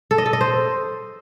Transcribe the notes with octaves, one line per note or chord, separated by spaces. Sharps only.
A4
D#5
A4
D#5
C5